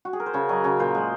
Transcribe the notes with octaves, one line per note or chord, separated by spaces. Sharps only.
F#4
G#4
A#4
C5
C#3 C#5
F#3 D#5
C#3 C#5
A#2 C5
G#3